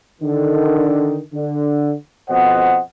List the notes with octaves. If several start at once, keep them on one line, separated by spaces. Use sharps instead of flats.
D3 D#3
D3
F2 B2 C5 D#5 F#5